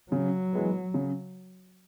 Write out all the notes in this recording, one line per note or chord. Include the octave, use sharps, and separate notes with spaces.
C#3 F#3
E3 G#3 B3
C#3